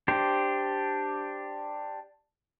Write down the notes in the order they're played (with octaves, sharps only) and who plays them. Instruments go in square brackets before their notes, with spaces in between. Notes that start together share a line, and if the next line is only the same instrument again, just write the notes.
[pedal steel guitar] D4 G4 C5